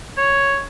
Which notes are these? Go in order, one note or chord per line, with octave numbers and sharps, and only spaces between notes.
C#5